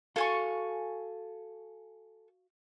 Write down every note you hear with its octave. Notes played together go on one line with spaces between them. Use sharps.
F#4 A4 F5 G#5 C#6